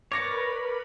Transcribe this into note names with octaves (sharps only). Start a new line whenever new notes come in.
A#4 B4 C#5 D5 B5 D6 A#6 C#7